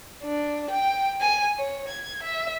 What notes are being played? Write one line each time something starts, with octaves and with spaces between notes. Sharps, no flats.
D4
G5
G#5
C#5
G#6
E5